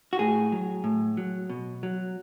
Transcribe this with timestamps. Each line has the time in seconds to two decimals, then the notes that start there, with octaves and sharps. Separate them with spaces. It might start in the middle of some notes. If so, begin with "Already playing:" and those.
0.13 F#4
0.19 A2 G#4
0.52 F#3
0.84 A2
1.17 F#3
1.50 B2
1.83 F#3